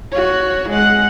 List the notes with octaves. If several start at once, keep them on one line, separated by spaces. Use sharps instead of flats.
F#4 C#5
G#3 F#5